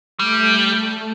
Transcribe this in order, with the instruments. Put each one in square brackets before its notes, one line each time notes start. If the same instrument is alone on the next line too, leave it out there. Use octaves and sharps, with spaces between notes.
[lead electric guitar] G3 [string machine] A3